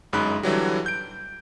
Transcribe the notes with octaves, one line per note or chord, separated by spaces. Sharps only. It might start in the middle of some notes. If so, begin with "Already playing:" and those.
G1 F#2 G#3 D#4 B5 F#6
D3 E3 F#3 G3
G6 D7